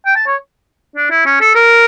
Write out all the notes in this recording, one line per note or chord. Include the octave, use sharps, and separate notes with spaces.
G5
A5
C#5
D4
E4
C#4
A4
A#4